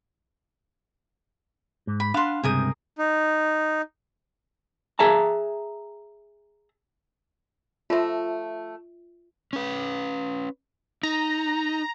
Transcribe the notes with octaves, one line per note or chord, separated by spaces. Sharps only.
G#2
B5
D4 F5 F#5 B5 C6
C#2 G2 C3 G#4 A#4 D#6
D#4
G#4 E5 A5 A#5
F3 A3 F4 E5
C#4 B4
D#4 A#5